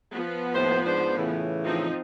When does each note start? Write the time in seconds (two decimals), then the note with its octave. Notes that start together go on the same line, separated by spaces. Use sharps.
0.11 F3 B3
0.55 D#2 A2 C5
0.86 G#2 D4 C5
1.17 A2 C#3 E3
1.64 F3 C4 D#4